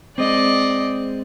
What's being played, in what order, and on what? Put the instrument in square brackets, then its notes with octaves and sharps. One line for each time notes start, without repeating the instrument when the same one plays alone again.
[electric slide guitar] G#3 C4 [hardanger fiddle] D5 D#5